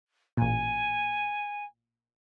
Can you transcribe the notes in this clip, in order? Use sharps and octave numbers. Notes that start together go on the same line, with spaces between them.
A1 A#2 G#5